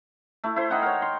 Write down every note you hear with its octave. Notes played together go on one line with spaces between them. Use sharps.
A3 E4
E4 C5
D#4 F#5 G5
A#4 C#5
C6